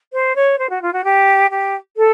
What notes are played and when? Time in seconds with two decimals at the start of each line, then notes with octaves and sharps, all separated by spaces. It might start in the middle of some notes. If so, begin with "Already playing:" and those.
0.13 C5
0.35 C#5
0.58 C5
0.70 F#4
0.82 F4
0.93 F#4
1.04 G4
1.50 G4
1.97 A4